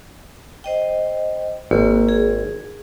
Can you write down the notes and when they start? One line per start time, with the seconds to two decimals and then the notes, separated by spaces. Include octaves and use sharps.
0.64 C5 D#5 G5
1.71 G#1 A#3
2.09 G#4